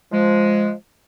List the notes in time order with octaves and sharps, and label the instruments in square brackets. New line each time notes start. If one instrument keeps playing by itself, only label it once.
[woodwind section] F3 G#3